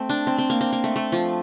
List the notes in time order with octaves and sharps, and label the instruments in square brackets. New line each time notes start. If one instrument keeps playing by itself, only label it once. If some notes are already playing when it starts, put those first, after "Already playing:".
Already playing: [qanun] A3 C4
D4
C4
C4
A#3
C4
A#3
A3
A3
F3